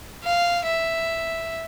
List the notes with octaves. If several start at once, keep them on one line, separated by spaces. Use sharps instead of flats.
F5
E5